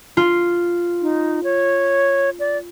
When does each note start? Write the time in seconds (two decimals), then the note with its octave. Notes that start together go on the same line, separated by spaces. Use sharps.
0.17 F4
1.02 D#4
1.44 C#5
2.39 D5